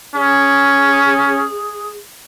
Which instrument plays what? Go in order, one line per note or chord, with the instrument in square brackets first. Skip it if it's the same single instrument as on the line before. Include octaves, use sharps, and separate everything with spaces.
[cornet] C#4 [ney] G#4